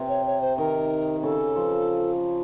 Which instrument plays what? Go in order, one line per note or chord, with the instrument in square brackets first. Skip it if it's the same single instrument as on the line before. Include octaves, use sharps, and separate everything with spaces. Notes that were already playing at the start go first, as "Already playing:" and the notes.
Already playing: [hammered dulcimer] C3
[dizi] C#5
C#5
C5
[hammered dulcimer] D#3 [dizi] A#4
[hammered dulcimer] C#3 [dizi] A4
[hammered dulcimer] F3